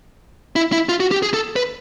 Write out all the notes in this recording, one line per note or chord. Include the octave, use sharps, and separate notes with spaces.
E4
E4
F4
F#4
G4
G#4
A4
B4